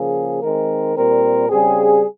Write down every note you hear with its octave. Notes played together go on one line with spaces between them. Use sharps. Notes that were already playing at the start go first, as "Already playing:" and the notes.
Already playing: C#3 F3 A#3 G#4
D#3 G#3 C4 A#4
A#2 G3 C4 A#4
C#3 G3 C4 G#4